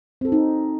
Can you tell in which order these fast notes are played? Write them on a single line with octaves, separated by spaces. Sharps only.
C4 A4 F#4 D#4